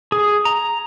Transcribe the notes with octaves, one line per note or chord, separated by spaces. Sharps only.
G#4
A#5